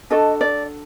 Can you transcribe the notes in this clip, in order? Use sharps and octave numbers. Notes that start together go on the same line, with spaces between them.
D4 F#4 A4 D#5
D5